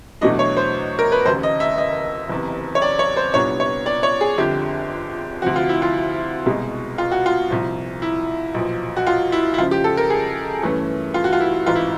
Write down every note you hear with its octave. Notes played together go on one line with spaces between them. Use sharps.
E2 B2 F#3 A3 D4 D#5
C#5
C5
A#4
B4
F1 D#2 C#3 C5
D#5
E5
D#5
F#1 E2 C3
C#5
D5
C#5
C5
C2 A#2 G3 B3 D4 C#5
C#5
D5
C#5
G#4
G1 F2 D3 G4
D2 C3 F3 F#4
F4
E4
F4
C2 B2 G#3
F4
F#4
F4
C2 A#2 F3
E4
B1 A#2 F3
F#4
F4
E4
E4
C#2 C#3 F3 F4
G4
A4
A#4
G#4
G2 E3 A3 C#4
F4
F#4
F4
E4
A1 G#2 E3 F4
E4